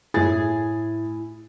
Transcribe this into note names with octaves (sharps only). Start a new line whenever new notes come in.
A2 E4 G#4 A6